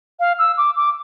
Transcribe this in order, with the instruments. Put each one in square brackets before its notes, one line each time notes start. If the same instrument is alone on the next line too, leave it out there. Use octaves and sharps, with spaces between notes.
[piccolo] F5
E6
D6
D6